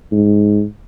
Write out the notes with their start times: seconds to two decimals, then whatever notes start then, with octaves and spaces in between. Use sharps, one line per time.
0.12 G#2